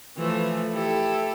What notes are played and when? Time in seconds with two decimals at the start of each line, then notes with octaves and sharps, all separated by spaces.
0.17 E3 F3 A3
0.73 E4 G4 A4